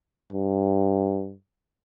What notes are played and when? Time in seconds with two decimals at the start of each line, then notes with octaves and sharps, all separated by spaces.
0.32 G2